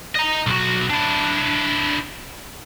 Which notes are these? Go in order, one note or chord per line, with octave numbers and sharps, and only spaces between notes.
D#5 A#5
B1 F#4
D4 E4